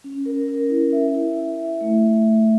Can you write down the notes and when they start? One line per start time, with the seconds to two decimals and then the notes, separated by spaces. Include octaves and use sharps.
0.04 C#4
0.26 A#4
0.49 A#4
0.70 E4
0.92 E5
1.14 E4
1.37 E5
1.59 E5
1.81 A3